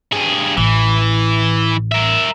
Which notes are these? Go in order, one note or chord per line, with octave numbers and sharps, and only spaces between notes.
G2 G#4
A1 E3
A#4 E5